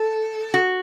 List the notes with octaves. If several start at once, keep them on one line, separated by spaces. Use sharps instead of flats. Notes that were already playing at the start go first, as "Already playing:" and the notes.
Already playing: A4
F#4